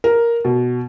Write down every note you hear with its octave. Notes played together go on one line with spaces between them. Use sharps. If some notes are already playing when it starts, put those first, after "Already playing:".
A#4
B2